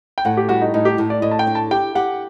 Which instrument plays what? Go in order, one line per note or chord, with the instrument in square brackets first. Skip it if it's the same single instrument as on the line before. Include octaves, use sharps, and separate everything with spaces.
[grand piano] G5
[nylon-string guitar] A2 [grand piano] F#5
[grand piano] G4
[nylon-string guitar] G3 [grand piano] F#4
[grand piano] D#4
[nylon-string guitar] A2 [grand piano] D#4
[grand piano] G4
[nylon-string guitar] A2
[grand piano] D5
[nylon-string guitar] A2 [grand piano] D#5
[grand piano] A5
G5
[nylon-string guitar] D4
[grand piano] A5
[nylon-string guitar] G4 [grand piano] G5
[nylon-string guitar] G4 [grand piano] F#5